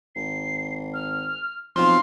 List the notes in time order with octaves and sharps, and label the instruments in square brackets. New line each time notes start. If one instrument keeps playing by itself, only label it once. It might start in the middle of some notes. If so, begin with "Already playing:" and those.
[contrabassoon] G#1 [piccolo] C7
[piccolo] F6
[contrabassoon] B1 [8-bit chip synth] F3 C4 F4 [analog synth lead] C6 [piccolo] F6